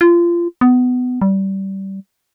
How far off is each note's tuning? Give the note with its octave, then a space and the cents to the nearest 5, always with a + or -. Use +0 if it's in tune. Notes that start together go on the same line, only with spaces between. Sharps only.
F4 -25
B3 +20
G3 -20